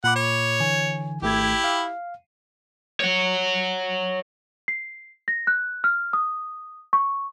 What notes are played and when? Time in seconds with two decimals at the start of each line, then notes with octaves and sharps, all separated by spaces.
0.04 A#2 F#5 B5 D6
0.16 C#5
0.60 D3 E3 G#5
1.22 G#1 A3 E4 G4 G#6
1.64 F5
3.00 C#5 F#5
4.68 C7
5.28 A#6
5.47 F#6
5.84 F6
6.13 D#6
6.93 C#6